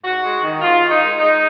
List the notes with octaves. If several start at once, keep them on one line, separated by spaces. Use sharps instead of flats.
G#2 F#4
G#3
D#3
G#2 F4
D#3
D#4
G#3
G#3 D#4